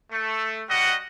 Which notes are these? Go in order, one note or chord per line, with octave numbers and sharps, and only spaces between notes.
A3
G3 F#4 D#5 F#5